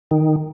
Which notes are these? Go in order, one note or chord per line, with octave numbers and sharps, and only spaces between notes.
D#3